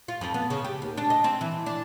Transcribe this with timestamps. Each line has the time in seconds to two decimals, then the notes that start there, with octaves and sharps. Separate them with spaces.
0.08 F4
0.21 F2
0.34 B3
0.50 C#3
0.64 G4
0.82 D#2
0.97 D4
1.10 D#5
1.24 C4
1.41 E3
1.66 D4